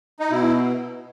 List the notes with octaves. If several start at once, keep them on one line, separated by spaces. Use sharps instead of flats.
D#4
B2 E4